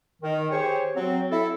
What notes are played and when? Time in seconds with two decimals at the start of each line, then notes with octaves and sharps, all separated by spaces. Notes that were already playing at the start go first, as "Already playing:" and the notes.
0.22 D#3
0.51 G4 G#4 C5 C#5
0.96 F#3 C4
1.32 E4 A4